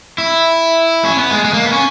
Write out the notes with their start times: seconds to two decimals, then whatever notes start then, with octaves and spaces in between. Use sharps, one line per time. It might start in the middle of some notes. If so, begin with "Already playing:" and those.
0.18 E4
1.05 C#4
1.19 B3
1.31 G#3
1.44 G#3
1.54 A#3
1.64 B3
1.72 C#4